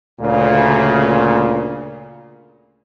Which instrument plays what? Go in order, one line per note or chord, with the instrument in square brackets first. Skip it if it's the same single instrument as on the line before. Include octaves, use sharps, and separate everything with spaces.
[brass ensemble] D2 A#2 C#3